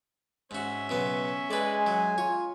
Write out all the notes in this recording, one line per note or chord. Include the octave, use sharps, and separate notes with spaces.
G#2 C#4 F#4 E5
B1 C#3 B3
G#3 B4 D5 G#5
F#3
F4 C#5